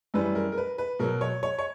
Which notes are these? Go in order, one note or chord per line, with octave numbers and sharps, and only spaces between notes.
F#2 E3 G3 B4
A#4
A#4
B4
B4
B2 F#3 A#4
C#5
C#5
C#5